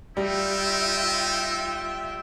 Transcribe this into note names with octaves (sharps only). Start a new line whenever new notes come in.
G3 D#4 F4 E5 G5